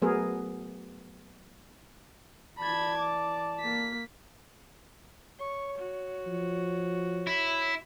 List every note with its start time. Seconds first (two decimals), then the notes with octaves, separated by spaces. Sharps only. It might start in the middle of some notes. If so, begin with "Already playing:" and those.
0.02 F#3 A3 B3 G#4 A#4
2.59 E3 D5 A5 B5 G#6
2.98 D6
3.60 A#3 B6
5.39 C#5 C#6
5.78 F#4
6.27 F3
7.27 E4